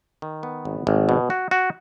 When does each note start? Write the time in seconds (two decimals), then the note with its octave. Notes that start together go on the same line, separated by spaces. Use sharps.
0.22 D#3
0.43 B3
0.65 G#1
0.87 G#1
1.09 B2
1.30 F#4
1.51 F#4